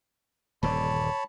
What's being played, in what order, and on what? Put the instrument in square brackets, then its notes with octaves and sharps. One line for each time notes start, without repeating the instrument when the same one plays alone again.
[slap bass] D#1 G2 D3 [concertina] C#5 A5 B5